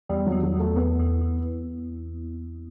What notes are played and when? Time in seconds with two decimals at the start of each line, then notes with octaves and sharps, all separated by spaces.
0.09 E2 G3
0.26 F#3
0.32 E2
0.43 F#3
0.54 E2
0.60 A3
0.76 E2 B3
0.99 E2
1.21 E2